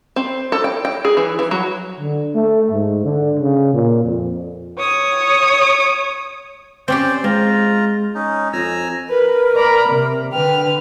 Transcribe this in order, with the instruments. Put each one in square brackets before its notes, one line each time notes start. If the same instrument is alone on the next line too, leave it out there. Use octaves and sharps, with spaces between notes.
[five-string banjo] C4
A4
G5
G5
G#4
E3
E3
F#3
[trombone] D3
A3
G#2
D3
C#3
A#2
F2
[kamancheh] C#5 D#6
[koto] C4 C#4 G4 [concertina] C5 D5
[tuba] G#3 [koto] C4 [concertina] F4 A#5
[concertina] C#4 D#4
[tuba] F2 [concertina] G#5 A#5 E6
[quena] A#4 [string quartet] B4
[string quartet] D5 A#5 B5
C3
[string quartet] D3 B4 F6 [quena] G5